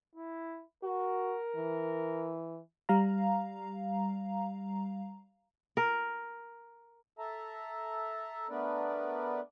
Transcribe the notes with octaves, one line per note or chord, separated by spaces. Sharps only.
E4
F#4 A#4
E3
G3 F5 A#5
A#4
A4 E5 A5 A#5
A3 B3 D4 A#4 B4 D5